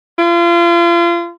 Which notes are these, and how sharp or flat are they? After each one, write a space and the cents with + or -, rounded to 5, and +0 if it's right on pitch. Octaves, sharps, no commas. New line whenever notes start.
F4 -35